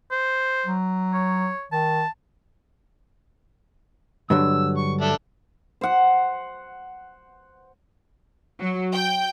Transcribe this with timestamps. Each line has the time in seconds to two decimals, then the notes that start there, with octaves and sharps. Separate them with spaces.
0.11 C5
0.66 F#3
1.13 C#5
1.72 D#3 A5
4.30 G2 D3 F#3 E6
4.77 C#6
5.01 D4 A4 E5
5.81 C5 F#5
8.60 F#3
8.93 G5